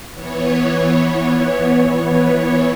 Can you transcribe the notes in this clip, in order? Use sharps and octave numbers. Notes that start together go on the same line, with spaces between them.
E3 B3 C#5